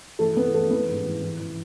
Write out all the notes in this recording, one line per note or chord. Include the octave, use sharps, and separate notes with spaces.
E3 A3 A4
E3 B3 B4
E3 A3 A4
E3 B3 B4
G#2
E3
E3
E3